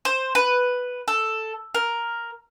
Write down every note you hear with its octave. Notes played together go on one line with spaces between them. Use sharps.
C5
B4
A4
A#4